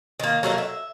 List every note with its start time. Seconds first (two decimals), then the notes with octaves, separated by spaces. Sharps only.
0.20 D#3 A#3
0.43 F#3 A3 A#3 E5
0.58 E5